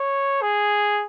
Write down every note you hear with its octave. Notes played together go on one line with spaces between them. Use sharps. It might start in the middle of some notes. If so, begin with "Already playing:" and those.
Already playing: C#5
G#4